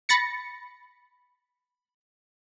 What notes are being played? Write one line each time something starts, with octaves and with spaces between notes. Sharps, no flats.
B5 A6 A#6 C#7